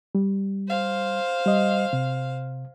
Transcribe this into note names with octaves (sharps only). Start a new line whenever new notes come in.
G3
C5 F5
G3 D#5
C3